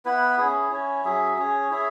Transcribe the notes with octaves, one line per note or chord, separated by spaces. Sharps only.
B3 E4 B4 F#5
C#4 E4 G#4
C#4 E4 C#5
F#3 C#4 G#4 E5
C#4 G#4 C#5
E4 G#4 C#5 E5